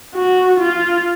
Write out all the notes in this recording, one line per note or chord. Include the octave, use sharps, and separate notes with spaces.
F#4
F4